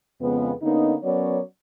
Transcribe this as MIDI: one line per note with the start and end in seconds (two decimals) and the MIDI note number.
0.21 0.51 41
0.21 0.51 49
0.21 0.51 56
0.21 0.51 59
0.62 0.94 50
0.62 0.94 58
0.62 0.94 59
0.62 0.94 61
0.62 0.94 63
1.04 1.40 54
1.04 1.40 59
1.04 1.40 61
1.04 1.40 70
1.04 1.40 73
1.04 1.40 74